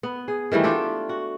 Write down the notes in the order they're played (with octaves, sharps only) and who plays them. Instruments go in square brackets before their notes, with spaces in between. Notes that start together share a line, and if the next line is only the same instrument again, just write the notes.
[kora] B3
G#4
D#3 E3 G3 A3
D4 F4 G4 A4
F#4